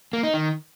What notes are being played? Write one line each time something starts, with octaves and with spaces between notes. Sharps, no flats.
A#3
D#4
D#3